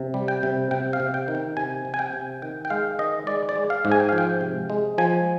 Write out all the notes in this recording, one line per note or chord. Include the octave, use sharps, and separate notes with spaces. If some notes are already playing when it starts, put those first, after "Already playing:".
Already playing: C3
G3
G5
C3
C3 G5
F5
C3
G5
D#3
G5
C3 G#5
C3
G#5
G5
C3
D#3 G5
G5
G#3 F5
D#3 D#5
G#3 D5
D5
G#3
F5
G#2
G#5
G5
F5
F3
G5
C3
G#3
F3 G#5